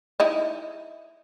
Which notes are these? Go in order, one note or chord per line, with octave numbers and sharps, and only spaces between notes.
D#4 E4 D#5